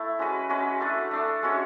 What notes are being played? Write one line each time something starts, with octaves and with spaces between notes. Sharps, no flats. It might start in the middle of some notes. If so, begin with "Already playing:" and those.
Already playing: A3 E4
G#3 C#4 F#4 B4
G#3 C#4 F#4 B4
A3 D4 A4
A3 D4 A4
G#3 C#4 F#4 C#5